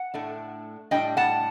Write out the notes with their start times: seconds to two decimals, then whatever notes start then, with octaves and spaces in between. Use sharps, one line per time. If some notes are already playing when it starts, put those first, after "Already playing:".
Already playing: F#5
0.14 A2 A3 D4
0.91 A2 G3 D4 D#5 G5
1.17 F#5 A5